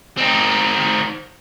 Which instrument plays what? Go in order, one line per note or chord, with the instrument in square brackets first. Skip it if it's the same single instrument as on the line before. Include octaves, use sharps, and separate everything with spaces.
[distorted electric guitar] C4 D#4